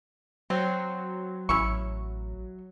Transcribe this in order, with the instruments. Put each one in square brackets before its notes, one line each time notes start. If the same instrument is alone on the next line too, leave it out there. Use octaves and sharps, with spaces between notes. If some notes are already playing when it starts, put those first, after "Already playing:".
[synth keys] F#3 [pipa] C4
[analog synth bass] A1 [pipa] C#4 E4 C#6